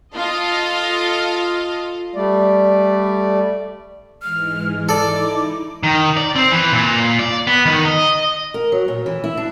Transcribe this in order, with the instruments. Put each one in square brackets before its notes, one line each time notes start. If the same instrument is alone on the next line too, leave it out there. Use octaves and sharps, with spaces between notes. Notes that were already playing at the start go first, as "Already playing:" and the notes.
[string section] F4 A4 D#5 F5
[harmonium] G3 A3 D5
[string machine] G#2 E3 G#3 [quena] F6
[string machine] D#4 E4 [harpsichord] A4 D5 [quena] D6
[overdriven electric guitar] D#3
D5
C4
E3
A#2
D5
B3
D#3
D#5
[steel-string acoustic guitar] A#4
F#3
A#2
E3
E4
D4